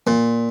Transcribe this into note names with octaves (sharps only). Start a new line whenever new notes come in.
A#2